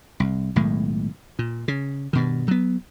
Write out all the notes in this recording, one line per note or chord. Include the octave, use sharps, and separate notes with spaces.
C2
B1 A2 D#3 G#3
A#2
C#3
G2 B2 D#3
F#3 B3